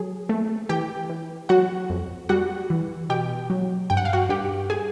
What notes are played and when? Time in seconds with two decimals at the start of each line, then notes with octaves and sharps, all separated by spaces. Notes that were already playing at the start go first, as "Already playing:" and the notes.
Already playing: F#3 G#4
0.29 A3
0.69 E3 G4 G5
1.10 E3
1.49 F#3 F#4 F#5
1.90 F2
2.29 G3 F#4 F#5
2.70 E3
3.10 B2 G4 G5
3.50 F#3
3.90 G2 G5
3.97 F#5
4.05 F5
4.13 F#4 F#5
4.29 G2 G4 G5
4.70 G#4 G#5